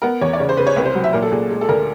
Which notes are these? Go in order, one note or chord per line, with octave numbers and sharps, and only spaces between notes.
B3 A#4
E2 C#5
D5
C#3 C#5
C5
C#3 B4
C#5
C2 B4
C5
F#3
E5
A#2 A#4
A4
A#2 G#4
G#3
A4
D2 A#4